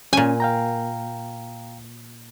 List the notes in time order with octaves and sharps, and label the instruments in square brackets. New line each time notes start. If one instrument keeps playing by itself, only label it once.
[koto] A#2 G#5 [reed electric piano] C#4
[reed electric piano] F5 G5 A#5